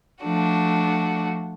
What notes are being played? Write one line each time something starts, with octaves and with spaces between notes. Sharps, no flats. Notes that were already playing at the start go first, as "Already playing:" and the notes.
F3 A3 D4 F#4